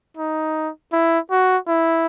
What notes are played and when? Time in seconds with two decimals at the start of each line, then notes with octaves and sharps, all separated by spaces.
0.17 D#4
0.93 E4
1.31 F#4
1.68 E4